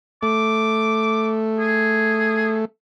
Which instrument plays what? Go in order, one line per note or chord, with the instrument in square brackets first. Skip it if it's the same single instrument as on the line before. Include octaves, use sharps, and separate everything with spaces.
[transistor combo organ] A3 [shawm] D6
[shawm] G#4